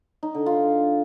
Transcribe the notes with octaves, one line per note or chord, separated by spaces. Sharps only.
D#4
D3
F4